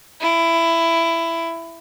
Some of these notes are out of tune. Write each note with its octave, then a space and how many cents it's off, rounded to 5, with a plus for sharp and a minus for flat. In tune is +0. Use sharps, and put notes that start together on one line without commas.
E4 +15